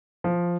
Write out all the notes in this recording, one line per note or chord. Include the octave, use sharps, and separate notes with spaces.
F3